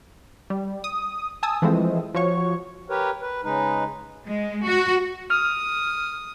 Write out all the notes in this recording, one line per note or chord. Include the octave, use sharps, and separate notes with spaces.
G3
D#6
G#5 A5 D#6 E6
E3 F3 G#3 A3 C4
F3 F#4 C#5 C#6
G4 A#4 B4 C#5
B4
C#3 G#3 D#4 B4
G#3
F#4
D#6 F6